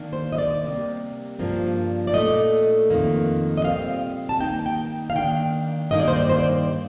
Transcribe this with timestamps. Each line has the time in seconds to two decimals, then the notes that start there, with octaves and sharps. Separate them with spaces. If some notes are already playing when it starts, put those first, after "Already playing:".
Already playing: D#3 A#3 D4
0.13 C5
0.32 D#5
0.38 D5
0.64 C3 G3 A#3
1.39 G2 F3 A#3 D4
2.07 D5
2.14 A#2 A3 D#4 D#5
2.90 F2 D#3 A#3
3.57 D#5
3.65 A#2 G3 C4 F5
4.29 A5
4.40 D#3 A#3 D#4 G5
4.66 G5
5.10 F5
5.15 D#3 A#3 D4 G5
5.91 G2 D#3 A#3 D#4 D#5
6.00 D5
6.08 C5
6.16 D5
6.29 C5
6.39 D5